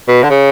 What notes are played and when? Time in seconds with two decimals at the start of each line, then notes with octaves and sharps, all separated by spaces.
0.08 B2
0.23 D3
0.30 C#3